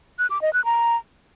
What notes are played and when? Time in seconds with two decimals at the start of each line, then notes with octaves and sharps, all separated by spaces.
0.19 F#6
0.30 D6
0.42 D#5
0.53 F#6
0.65 A#5